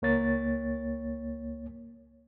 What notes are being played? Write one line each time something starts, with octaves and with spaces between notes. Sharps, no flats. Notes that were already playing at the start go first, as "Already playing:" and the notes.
C#2 A#3 C#5 A6